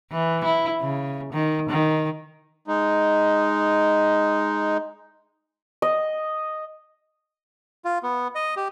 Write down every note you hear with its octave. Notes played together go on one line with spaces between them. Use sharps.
E3
E4
C#3
D#3
D#3
G#3 D#4
D#5
F4
B3
D#5
G4